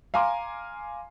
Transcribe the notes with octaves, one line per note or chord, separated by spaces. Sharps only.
F5 G#5 A#5 C6 D6